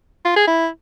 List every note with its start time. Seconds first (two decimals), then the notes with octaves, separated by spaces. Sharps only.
0.25 F4
0.36 G#4
0.47 E4